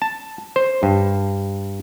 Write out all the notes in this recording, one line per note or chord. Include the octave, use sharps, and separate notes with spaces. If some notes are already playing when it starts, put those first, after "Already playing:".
A5
C5
G2